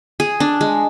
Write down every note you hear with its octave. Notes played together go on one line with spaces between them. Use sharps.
G#4
D4
G#3